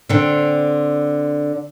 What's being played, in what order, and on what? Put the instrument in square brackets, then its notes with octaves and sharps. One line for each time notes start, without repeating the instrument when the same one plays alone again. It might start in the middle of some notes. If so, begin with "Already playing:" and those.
[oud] D3 C4